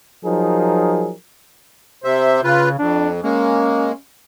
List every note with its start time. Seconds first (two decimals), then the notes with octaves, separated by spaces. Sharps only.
0.25 F3 F#3 D#4 G#4 A#4
2.04 C3 C5 E5
2.44 C#3 F4 B4
2.79 F2 D4
3.24 G#3 A#3 C#4